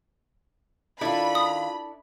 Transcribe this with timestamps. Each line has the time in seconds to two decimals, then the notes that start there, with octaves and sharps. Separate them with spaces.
1.01 D#3 D4 E4 F4 A4 B5
1.35 D#6